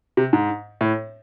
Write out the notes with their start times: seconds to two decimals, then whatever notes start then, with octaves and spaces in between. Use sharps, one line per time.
0.17 C3
0.33 G#2
0.81 A2